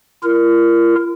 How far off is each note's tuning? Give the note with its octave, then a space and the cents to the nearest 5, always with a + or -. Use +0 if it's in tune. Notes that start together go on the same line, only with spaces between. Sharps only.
F4 -45 A#4 +0